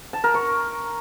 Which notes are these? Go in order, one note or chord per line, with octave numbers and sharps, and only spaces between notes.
A5
A#4
C#6